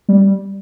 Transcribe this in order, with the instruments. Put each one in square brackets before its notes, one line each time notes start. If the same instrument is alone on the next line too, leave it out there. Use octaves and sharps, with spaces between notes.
[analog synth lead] G3